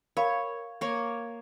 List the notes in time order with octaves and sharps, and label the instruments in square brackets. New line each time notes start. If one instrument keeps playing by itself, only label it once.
[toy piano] A#4 F5 B5 [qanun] C#5
[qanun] A#3 C#5